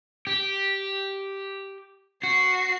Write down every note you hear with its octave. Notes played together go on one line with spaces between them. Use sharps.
G4
F#4 C7